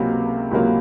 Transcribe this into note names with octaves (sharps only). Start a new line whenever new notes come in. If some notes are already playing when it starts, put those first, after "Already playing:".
Already playing: C#2 C3 F#3 A#3 F4
C#2 C3 F#3 A#3 F4